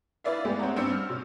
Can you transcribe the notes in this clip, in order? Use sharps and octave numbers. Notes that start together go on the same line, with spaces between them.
E4 B4 D5 E5 F5
G#3 A3 B3 G4
C4 C#5 F#5 A#5
G2 C4 D4 E6 C#7
F6
B2